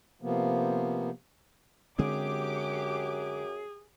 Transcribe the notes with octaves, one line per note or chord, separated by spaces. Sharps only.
C3 F3 A#3 B3
F#2 D3 G#3 C4 G4 G#4 D6